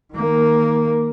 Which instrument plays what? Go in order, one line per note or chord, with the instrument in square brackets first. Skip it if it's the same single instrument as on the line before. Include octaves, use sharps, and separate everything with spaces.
[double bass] D#3 A#3